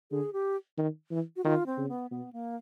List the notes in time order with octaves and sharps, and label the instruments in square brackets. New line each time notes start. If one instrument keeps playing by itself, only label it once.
[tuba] D3 [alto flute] G#4
[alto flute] G4
[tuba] D#3
E3
[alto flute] F#4
[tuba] D#3 [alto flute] F4
[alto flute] C4
[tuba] C#3
[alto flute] B3
[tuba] B2 [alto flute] B3
[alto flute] A#3